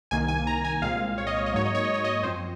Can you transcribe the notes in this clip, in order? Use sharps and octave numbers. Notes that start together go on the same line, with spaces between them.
C2 C3 D#3 A#3 G#5
G#5
A#5
G#5
C2 A#2 G#3 C4 F5
C#5
D#5
C#5
D#5
G#2 F#3 A#3 C#5
D#5
C#5
D#5
C#5
D#5
C#5
F#2 F3 C4 C5